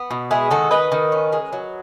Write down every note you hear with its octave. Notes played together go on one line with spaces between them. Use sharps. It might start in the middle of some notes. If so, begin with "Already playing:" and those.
Already playing: B3
B2
G#3 E4 G#4
D#3 F#4 A4
D#3 B4 D#5
D#3
C#4
G#3
F#3